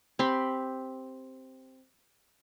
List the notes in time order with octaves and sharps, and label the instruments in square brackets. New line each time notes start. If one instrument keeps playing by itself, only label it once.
[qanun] C4 G4 B5 C6